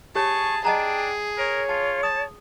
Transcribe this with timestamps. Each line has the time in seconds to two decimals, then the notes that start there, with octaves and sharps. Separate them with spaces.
0.15 G4 G#4 C#5 A5 C#6
0.65 D4 G#4 D#5 G5 A5 A#5
1.38 A#4 C#5
1.69 F4 A5
2.03 A5 D#6